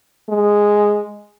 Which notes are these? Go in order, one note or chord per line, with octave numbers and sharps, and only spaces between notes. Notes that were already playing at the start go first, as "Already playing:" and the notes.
G#3